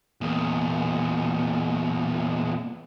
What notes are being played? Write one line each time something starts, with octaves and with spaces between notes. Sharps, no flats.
E2 A#2